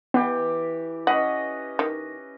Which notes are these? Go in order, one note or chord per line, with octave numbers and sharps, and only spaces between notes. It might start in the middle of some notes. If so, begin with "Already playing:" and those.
E3 B3 G4
C#4 B4 D#5 F#5
D#3